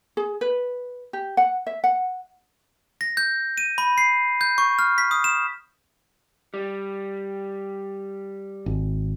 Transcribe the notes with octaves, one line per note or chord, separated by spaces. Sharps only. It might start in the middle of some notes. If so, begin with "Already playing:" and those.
G#4
B4
G4
F#5
E5
F#5
A#6
G6
D#7
B5
C7
G6
C#6
F6
B6
D#6
E7
G3
G#1